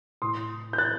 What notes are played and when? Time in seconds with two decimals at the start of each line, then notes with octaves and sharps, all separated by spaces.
0.22 A2 C6 D#6
0.73 G6
0.78 F#6 A6